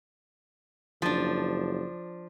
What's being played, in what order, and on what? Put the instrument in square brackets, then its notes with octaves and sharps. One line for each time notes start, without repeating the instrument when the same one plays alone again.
[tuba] F#1 [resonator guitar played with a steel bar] F3 D4